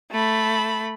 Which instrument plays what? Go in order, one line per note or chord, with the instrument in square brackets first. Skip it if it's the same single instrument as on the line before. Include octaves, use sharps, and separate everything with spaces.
[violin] A3 B5